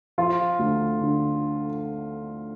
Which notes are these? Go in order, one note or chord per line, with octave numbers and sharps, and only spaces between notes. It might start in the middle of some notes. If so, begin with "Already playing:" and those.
F3 F4
D2
D3